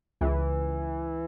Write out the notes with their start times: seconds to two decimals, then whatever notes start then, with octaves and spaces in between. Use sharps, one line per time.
0.21 C#2 E3